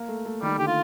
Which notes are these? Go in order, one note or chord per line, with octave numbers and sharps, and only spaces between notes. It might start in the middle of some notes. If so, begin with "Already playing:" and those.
Already playing: A#3
A3
A3
D#3 G3
D3 G4
F4